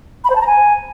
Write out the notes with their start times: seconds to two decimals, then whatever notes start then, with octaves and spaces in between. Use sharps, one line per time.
0.24 B5
0.30 C5
0.35 A5
0.41 A#5
0.47 G#5